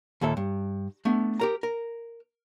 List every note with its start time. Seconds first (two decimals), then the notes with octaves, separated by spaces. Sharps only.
0.21 D#2 A#2 A4 E5
0.37 G2
1.05 A3 B3 D4
1.40 G4 A#4 A#5
1.63 A#4